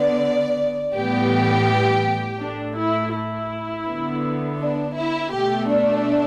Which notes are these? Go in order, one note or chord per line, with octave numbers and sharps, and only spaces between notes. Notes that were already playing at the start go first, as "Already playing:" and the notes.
Already playing: D3 B3 D5
A2 E3 G3 B3 G4
A2 A3 D4
E4
E4
D3 B3
D4
E4
B2 A3 G4
D4